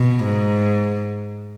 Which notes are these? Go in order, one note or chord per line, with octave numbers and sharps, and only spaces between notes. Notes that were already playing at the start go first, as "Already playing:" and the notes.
Already playing: B2
G#2